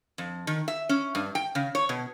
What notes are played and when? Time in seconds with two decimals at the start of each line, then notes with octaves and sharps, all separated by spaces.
0.18 F2
0.47 D#3
0.68 E5
0.89 C#4
1.15 G2
1.35 G5
1.55 C#3
1.75 C#5
1.89 B2